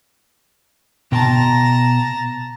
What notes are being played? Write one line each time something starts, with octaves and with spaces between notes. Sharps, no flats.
B2 G5 A5 A#5 C6